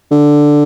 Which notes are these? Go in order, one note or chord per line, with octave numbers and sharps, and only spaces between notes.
D3